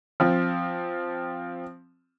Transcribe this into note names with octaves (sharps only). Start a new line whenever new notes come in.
F3 C4